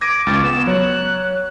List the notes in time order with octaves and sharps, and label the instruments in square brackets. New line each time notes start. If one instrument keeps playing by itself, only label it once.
[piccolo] D6 [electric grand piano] G#6 A#6 D#7
[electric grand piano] C#2 [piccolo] A6
[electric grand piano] B3 [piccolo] E7
[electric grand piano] F#3 C#5 [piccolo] F#6